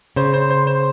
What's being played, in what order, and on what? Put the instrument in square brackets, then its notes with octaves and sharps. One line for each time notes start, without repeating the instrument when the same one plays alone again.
[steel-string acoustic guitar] C#3 [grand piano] C5
[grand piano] C5
C5
C5